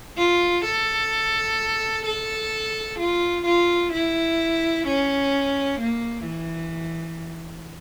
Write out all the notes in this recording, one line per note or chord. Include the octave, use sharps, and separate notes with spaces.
F4
A4
A4
F4
F4
E4
C#4
A#3
E3